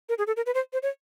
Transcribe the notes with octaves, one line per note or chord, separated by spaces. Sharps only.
A#4
G#4
A4
A#4
B4
C5
C5
C#5